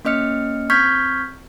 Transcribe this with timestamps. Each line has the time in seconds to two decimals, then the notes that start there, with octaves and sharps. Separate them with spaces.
0.05 A#3 C#4 D#5 F6 C#7
0.70 C4 C#6 F6 G6 G#6 B6